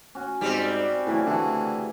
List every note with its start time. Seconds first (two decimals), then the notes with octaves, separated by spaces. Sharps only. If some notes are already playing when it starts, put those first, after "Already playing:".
0.15 C#4 F#4
0.41 G#2 G3 C4
1.07 A2 C#3 E3 F#3
1.27 D3 E3 A3